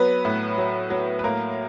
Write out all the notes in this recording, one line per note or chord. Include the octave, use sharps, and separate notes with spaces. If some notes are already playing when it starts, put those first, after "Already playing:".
Already playing: F#3 B3 B4
A2
F#3
F#3
B4
A2 A#3 A#4